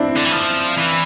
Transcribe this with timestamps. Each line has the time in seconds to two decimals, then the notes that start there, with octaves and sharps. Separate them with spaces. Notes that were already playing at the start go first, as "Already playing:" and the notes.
Already playing: C4 D4 E4
0.16 D3
0.25 E3
0.32 F3
0.78 E3